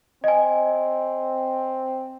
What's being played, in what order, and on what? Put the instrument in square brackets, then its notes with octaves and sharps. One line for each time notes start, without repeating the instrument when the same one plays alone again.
[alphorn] C4 [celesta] D#5 G#5